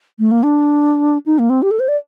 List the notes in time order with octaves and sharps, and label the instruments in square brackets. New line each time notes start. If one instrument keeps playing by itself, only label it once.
[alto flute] A3
A#3
D4
D#4
A#3
C4
G4
A4
C5
D5